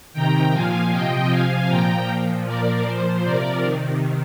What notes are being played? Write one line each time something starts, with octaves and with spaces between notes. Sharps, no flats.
C3 D#3 G5 A#5
A#2 F3 F5 G#5
C3 F3 D#5 G5
C3 F3 F5 G#5
A#2 F3 G5 A#5
A#2 F3
A#2 F3 A#4 D5
A#2 F3 C5
C3 F3 A#4 D5
C3 D#3